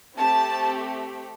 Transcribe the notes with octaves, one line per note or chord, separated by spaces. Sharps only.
A3 C4 G4 A5